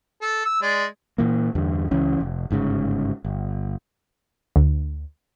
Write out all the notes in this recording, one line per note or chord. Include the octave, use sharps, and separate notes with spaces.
A4
E6
G#3 D5
A#2 E3 A#3
E2 G2 D3
C#2 E3 C#4
F1
G1 G#2 C#3
G1
D2